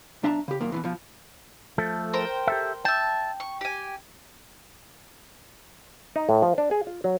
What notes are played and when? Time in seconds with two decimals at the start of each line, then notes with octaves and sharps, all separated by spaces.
0.23 B1 D4 E5 A5 A#5
0.48 C#3 G4
0.61 F#2 A#2 D#3 A#3
0.72 B2 D#3 E3
0.84 B2 F3
1.78 F3 A3 A4
2.13 A#4 C5 G5
2.47 G4 A4 E5
2.85 E5 G5 A5
3.40 C#6
3.61 G4 G#5
6.16 D#4
6.29 A2
6.42 F3
6.58 D4
6.71 G#4
6.87 F4
7.04 F#3